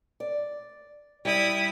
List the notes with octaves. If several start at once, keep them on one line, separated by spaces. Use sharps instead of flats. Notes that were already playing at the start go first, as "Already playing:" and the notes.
D5
G3 E4 D#6